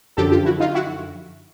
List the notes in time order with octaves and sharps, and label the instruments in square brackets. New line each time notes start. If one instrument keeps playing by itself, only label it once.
[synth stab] F#2 D3 F3 G4 A4
F4 G4
E4 F#4
D#4 F4
E4 F#4